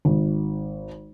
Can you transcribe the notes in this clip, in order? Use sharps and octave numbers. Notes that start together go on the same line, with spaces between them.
G#1